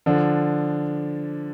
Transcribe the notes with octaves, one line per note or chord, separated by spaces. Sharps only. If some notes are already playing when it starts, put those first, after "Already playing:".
D3 F3 D4